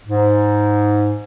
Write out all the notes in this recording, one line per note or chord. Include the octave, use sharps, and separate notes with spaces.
G#2